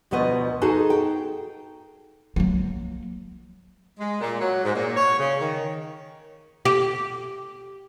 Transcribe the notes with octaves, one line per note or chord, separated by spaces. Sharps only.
D2 B2 F3 B3 D#5
D#4 F#4 G#4 A4
G5
F#3 A#3
G#3
A#2
F#3
G#2
A#2
C#5
C#3
D#3
G4